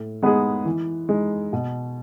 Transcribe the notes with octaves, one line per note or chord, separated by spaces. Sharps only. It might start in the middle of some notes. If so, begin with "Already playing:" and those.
Already playing: A2
G#3 B3 D#4 G#4
E3
G#3 D#4
B2